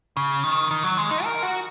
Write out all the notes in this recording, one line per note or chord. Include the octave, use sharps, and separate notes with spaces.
C#3
D#3
D#3
F#3
G#3
D#4
A#4
F#4